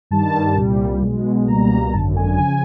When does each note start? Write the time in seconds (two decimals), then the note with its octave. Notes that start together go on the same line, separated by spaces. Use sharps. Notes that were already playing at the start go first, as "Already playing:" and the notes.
0.11 G2 D#3 G3 A5
0.56 C2 A#2 G3
1.02 B1 B2 G#3
1.48 C#2 B2 G3 A#3 A#5
1.86 A#5
1.93 G#1 F#2 D3 A5
2.16 G#5
2.38 C#3 F3 G#5